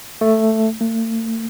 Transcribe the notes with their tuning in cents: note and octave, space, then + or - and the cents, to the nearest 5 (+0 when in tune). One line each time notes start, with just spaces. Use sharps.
A3 +5
A3 +45